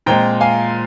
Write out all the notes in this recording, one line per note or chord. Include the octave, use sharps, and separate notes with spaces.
A#2 F3 G#3 C4 G5 A#5
F5 G#5